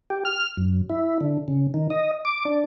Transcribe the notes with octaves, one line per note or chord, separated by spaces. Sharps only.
G4
F6
F#2
E4
D3
C#3
D#3
D#5
D6
D4